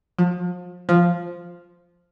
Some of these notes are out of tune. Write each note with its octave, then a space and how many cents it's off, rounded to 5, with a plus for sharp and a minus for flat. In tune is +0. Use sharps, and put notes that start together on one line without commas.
F3 +35
F3 +0